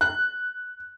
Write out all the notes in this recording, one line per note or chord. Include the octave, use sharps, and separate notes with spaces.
F#6